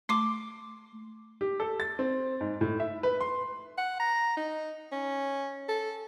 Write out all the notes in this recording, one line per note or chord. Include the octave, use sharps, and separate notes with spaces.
A3 C6 D6
G4
A4
A6
C4
G#2
A2
E5
B4
C6
F#5
A#5
D#4
C#4
A4